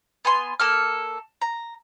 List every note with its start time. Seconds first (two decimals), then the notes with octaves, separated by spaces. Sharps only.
0.25 B3 G#5 C6
0.60 A#3 A4 F6
1.42 A#5